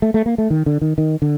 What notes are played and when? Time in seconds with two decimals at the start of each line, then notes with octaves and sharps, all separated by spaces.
0.02 A3
0.14 A3
0.26 A#3
0.38 A3
0.50 D#3
0.66 D3
0.82 D#3
0.98 D#3
1.22 D3